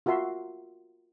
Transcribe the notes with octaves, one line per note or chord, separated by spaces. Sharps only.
F4 F#4 A#4 E5 C6